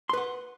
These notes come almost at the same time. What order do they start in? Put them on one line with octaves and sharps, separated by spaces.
C6 B4 F#5